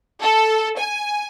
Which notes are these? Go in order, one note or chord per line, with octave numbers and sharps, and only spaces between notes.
A4
G#5